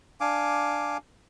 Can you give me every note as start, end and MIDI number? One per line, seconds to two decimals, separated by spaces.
0.21 0.97 62
0.21 0.97 77
0.21 0.97 80
0.21 0.97 86